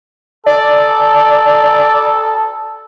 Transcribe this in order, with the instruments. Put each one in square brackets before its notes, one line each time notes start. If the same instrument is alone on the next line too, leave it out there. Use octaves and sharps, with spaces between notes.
[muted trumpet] A4 [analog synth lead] D5